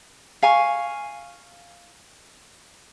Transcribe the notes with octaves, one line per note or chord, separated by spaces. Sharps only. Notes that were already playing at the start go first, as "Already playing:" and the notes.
F5 G#5 C#6